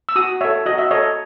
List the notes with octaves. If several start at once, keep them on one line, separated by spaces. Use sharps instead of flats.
E6
F#4 D#6
A4 C#5 E5
F#4 D#5
E5
A4 C#5 D#5